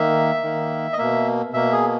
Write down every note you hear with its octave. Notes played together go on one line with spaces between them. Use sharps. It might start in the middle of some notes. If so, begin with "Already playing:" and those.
Already playing: D#3 A#3 E5
D#3 A#3
D#5
B2 A#3 E5
B2 A#3 E5
G#4